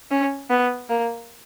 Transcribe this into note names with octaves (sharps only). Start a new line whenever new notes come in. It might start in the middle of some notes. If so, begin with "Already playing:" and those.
C#4
B3
A#3